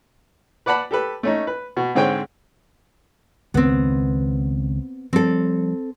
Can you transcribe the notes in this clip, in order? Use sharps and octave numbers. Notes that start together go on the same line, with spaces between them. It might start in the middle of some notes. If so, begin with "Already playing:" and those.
B4 D5 F#5 A5 B5
G4 A4 B4
A3 C#4 D#4
B4
B2
G#2 D3 C4 G#4 C#5 G5
C#2 D#3 B3 C4
F3 G3 C4 A4